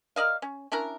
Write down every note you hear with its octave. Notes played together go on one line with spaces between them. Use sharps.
A#4 D5 D#5 F5
C#4
C#4 D4 E4 A#4